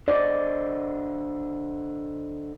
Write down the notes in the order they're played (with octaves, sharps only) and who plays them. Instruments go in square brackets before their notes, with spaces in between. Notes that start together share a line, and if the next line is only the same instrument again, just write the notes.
[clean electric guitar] D3 C5 D#5 [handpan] D5